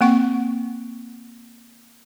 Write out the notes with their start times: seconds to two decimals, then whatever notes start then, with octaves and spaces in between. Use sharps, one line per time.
0.01 A#3 C4 F#5 C#6